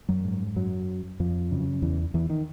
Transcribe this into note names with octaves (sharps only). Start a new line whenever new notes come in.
F#2 F#3
G#2
F#2 F#3
F2 F3
F#2 C#3
E2 E3
E2 E3
D#3